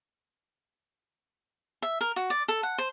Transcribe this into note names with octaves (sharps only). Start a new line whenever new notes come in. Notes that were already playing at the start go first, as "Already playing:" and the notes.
E5
A#4
F#4
D5
A4
F#5
C5